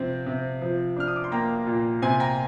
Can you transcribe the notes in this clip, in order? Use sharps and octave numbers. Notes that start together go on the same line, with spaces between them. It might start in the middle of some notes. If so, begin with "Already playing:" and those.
Already playing: C3 F3 C4
C3
F3
D4 F6
D#6
D6
C6
A#3 G5 A#5
A#2
C3 G#5 C6
G5 A#5